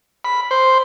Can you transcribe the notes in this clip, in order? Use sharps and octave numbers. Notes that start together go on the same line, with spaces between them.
B5
C5